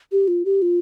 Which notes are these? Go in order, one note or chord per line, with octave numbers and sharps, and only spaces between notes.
G4
F4
G4
F4